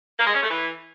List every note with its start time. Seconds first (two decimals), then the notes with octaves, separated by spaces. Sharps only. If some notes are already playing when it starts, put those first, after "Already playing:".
0.18 A#3
0.26 G#3
0.34 C#4
0.42 A3
0.50 E3